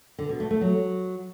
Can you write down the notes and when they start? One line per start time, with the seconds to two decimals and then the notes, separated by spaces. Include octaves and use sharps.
0.18 D3
0.29 B2
0.40 A3
0.51 A3
0.61 F#3